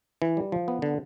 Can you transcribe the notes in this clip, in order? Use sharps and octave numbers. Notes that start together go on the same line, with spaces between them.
E3
G3
F3
B3
D3